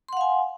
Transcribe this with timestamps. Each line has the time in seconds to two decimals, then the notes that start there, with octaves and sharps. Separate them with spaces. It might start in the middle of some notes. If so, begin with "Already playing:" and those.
0.09 C6
0.13 F#5
0.17 F5
0.21 G#5